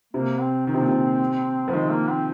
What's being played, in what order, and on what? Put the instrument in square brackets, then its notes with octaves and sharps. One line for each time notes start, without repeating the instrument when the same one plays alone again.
[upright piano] C3 [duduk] A#3
[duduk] C4
[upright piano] D#3 [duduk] C4
[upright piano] C3
A#2
C3
F3
[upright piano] D#3 [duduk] G#3
[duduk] A#3
C4